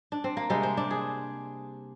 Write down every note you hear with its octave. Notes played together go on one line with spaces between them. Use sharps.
D4
C4
A#3
C3 G3 G#3
C4
D4
G#4